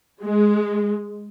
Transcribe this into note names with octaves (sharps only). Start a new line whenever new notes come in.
G#3